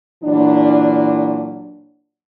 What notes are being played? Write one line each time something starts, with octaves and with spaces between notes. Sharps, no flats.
A#2 E3 F#3 D4